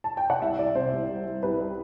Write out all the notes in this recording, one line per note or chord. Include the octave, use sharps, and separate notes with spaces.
A5
G5
F#5
C2 E5
C2 D5
C3 C5
C2
G3
G3
C2 B4
G3